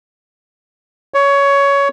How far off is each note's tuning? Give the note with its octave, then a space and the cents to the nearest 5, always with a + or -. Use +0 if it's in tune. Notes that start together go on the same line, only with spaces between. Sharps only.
C#5 +15